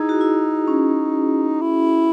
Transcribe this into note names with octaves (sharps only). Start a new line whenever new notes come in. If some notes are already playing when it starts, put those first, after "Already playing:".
Already playing: D#4 E4 G#4
F#4
E4
C#4
E4